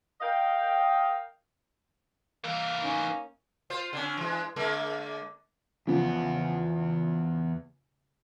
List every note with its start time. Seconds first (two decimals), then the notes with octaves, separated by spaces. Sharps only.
0.21 A#4 D#5 F5 G5
2.44 E3 A#3 A#4
2.81 C#4 D#4
3.70 F4 C5
3.93 D3 C#4
4.17 E3 G#3
4.56 D3 G#3 A#3
5.87 E2 C#3 F3 B3